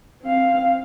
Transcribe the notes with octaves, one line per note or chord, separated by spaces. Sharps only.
C4 F5